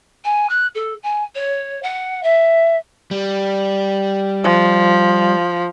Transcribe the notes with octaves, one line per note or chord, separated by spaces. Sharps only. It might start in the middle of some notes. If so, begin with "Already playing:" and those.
G#5
F#6
A4
G#5
C#5
F#5
E5
G3
F3